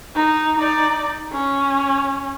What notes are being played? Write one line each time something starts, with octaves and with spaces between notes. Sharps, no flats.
D#4
D#4 D5
C#4